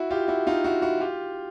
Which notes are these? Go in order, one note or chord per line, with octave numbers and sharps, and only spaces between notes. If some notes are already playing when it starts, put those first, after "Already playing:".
Already playing: E4 F#4
F4 G4
E4 F#4
D#4 F4
E4 F#4
E4 F#4
F4 G4